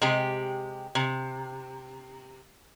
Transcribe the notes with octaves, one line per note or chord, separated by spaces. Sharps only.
C3 G#3 G4
C3